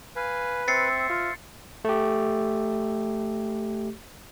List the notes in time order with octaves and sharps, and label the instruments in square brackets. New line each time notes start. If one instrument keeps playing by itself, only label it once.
[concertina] B4 [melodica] F5 G#5
[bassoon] C4 [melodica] C5 E5 [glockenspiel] A6 C7 C#7
[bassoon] F4
[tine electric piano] A3 G4